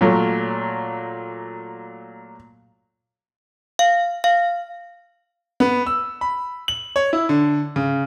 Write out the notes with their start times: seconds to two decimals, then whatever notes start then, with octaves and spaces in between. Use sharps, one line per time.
0.01 A#2 F#3 A3
3.79 F5
4.24 F5
5.60 B3
5.86 E6
6.21 B5
6.68 F#7
6.96 C#5
7.13 E4
7.29 D3
7.76 C#3